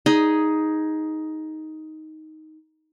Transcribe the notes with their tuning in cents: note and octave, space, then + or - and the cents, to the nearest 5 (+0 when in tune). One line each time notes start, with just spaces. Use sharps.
D#4 +10 G#4 +0